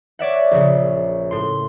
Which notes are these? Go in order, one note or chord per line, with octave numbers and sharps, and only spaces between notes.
C#5 D5 E5 F#5
A#1 C#3
A2 C6